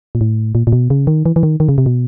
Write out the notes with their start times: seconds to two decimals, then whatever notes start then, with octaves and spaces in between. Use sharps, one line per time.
0.15 A#2
0.21 A2
0.55 A#2
0.67 A#2
0.72 B2
0.90 C#3
1.07 D#3
1.26 E3
1.36 E3
1.43 D#3
1.60 D#3
1.69 C#3
1.78 C3
1.86 B2